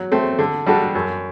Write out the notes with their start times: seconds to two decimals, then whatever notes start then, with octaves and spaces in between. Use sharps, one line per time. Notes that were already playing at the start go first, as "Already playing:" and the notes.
Already playing: F#3
0.12 A3 C4
0.39 D3
0.67 G3 D4 F#4 A4
0.95 F#2